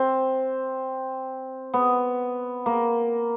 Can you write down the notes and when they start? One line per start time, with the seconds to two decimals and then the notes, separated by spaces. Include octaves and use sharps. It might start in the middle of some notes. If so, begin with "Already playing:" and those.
Already playing: C4
1.74 B3
2.66 A#3